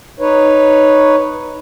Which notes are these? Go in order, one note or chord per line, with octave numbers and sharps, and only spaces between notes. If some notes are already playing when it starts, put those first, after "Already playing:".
D#4 B4 C#5